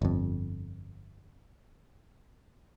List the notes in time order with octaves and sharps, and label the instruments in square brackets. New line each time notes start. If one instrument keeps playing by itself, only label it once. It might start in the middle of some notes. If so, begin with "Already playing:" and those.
[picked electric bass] G1 F2